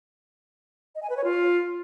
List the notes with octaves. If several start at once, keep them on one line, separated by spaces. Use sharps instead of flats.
D#5
G#5
B4
C#5
F4